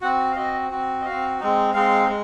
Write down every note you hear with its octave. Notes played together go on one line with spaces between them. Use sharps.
C4 F#4 F#5
F5
C4 F#4 D#5
C4 F#4
D#5
C4 F#4 F5
G#3 C4 D#4
G#3 C4 D#4 F5
G#3